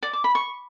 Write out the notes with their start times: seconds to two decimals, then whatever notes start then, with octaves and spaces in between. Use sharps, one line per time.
0.03 D5
0.13 D6
0.24 B5
0.35 C#6